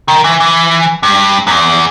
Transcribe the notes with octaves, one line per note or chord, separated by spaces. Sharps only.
D#3
E3
E3
G2
F#2
E2